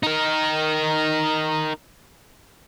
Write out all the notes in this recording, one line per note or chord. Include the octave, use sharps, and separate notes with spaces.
D#4 A#4